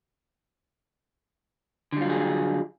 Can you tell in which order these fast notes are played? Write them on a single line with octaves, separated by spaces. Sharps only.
D3 G3 F4 F#3 G#4